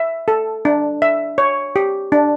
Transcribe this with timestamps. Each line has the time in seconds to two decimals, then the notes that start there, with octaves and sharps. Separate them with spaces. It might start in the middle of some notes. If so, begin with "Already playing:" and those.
Already playing: E5
0.28 A4
0.65 D4
1.02 E5
1.38 C#5
1.76 G4
2.12 D4